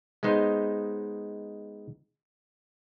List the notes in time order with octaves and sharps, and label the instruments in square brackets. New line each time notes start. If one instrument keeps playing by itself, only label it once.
[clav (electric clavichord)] G#3 B3 D#4 C5